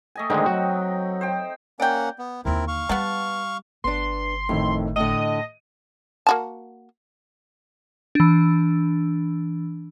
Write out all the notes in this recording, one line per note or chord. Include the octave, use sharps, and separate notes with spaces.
A3 D#5 G#5
D3 D#3 G#3 C4 D#4 G5
F#3 F#4
C5 G5
A#3 C#4 D5 F#5 G5
B3
D#2 D3 C4 E4 A#4
F5 C#6
G3 B3 F#5 A5
G1 B3 D4 C6
F2 A2 D#3
A2 D3 D#5 D#7
A#3 F#4 A5
E3 D4